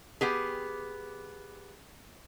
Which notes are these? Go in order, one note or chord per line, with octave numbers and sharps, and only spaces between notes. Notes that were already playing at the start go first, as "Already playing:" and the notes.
B3 G4 G#4